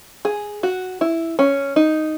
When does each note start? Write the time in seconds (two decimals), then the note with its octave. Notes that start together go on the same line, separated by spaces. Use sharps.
0.25 G#4
0.63 F#4
1.01 E4
1.39 C#4
1.76 D#4